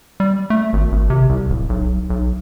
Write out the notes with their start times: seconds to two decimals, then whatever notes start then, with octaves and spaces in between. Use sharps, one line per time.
0.20 G3
0.50 A3
0.73 G#1
0.92 G#1
1.10 C3
1.29 C2
1.50 D1
1.69 B1
2.10 B1